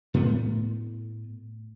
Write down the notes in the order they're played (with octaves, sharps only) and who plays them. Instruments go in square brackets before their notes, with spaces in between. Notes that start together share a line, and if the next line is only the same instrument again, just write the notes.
[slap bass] A2 A3 B3